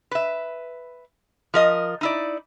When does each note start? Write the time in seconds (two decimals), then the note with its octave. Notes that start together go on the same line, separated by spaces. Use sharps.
0.11 B4 E5
1.54 F3 A#4 D#5
2.01 D#4 E4 D5